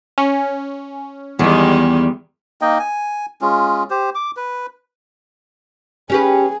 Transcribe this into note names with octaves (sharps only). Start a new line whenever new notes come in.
C#4
E2 D#3 G3 G#3
A#3 D#4 D#5 G5
G#5
G#3 C#4 F4
G4 C5
D6
B4
C#4 G4 G#4 B4